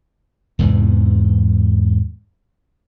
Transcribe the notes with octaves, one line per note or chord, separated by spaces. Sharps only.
E2 G#2 C3 E3